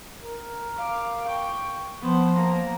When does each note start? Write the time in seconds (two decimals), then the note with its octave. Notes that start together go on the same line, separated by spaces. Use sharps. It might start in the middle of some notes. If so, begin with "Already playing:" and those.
0.21 A#4
0.76 F5 D6
1.27 G5 C#6
2.01 F3 B3 C5
2.36 A#3 A#5